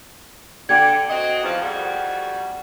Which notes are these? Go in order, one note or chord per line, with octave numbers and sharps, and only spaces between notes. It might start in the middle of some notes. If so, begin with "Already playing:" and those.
D3 G5 G#6
C4 F#4 D#5
E2 F3
F2 G3 F#4